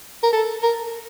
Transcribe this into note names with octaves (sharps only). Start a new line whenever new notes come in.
A#4
A4
A#4